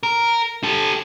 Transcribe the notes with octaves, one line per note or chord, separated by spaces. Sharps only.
A#4
G4 A4